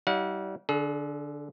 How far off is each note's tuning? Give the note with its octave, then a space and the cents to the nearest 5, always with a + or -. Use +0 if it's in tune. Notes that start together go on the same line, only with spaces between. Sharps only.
G3 -30 E4 -45 F#5 -45
D3 +0 G#4 +40